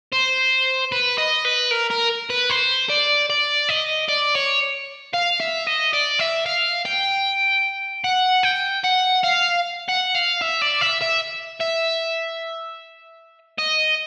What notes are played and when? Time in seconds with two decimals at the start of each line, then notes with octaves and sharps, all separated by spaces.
0.13 C5
0.92 B4
1.18 D#5
1.45 B4
1.71 A#4
1.91 A#4
2.30 B4
2.50 C5
2.89 D5
3.30 D5
3.69 D#5
4.08 D5
4.35 C#5
5.14 F5
5.40 E5
5.67 D#5
5.93 D5
6.19 E5
6.46 F5
6.86 G5
8.04 F#5
8.43 G5
8.84 F#5
9.23 F5
9.89 F#5
10.15 F5
10.42 E5
10.62 D5
10.81 E5
11.01 E5
11.61 E5
13.59 D#5